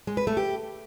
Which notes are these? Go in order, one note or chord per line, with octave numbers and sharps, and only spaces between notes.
G#3
B4
A3
G4